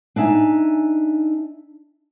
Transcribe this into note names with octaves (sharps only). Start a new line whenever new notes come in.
D4 D#4 E5 G#5